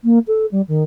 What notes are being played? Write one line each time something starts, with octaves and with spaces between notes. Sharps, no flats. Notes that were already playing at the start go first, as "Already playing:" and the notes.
A#3
A4
G3
D#3